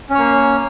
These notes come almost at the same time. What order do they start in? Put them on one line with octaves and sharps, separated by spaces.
C#4 C#5 A#3